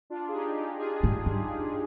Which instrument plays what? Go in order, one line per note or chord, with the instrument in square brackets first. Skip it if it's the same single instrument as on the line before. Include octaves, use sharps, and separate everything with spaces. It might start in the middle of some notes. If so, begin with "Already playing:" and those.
[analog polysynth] D4 F4
G#4
D#4 G4
G#4
D#4 G4
F4 G#4
[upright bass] G#2
G2